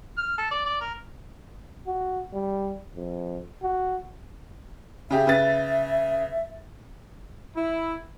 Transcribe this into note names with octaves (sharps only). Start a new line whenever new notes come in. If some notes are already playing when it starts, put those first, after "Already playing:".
F6
A4
D5
D5
A#4
F#4
G3
F2
F#4
C#3 G4 G#4 E5
C#3 B4 A6
E4